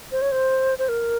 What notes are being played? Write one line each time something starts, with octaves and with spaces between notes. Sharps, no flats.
C5
C#5
C5
C5
A#4